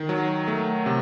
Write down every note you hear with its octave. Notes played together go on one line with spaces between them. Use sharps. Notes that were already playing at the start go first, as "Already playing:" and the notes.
Already playing: D#3
F#3
A3
C3